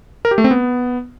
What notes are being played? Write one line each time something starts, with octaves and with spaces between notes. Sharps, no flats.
A#4
G4
A3
C4
B3